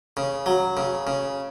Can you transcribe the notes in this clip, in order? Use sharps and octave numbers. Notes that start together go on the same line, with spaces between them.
C#3
F#3
C#3
C#3